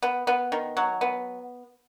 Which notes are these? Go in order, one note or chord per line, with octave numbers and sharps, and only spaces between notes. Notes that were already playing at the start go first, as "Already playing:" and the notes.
B3
B3
D#3
F#3
B3